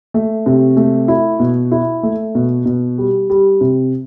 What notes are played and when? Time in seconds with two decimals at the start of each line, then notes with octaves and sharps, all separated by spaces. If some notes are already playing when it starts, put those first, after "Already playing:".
0.14 A3
0.46 C3
0.77 A3
1.08 E4
1.39 B2
1.72 E4
2.03 A3
2.35 B2
2.65 B2
2.98 G3
3.30 G3
3.61 C3